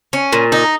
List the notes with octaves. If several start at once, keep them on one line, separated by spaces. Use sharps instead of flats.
C#4
A#2
D#4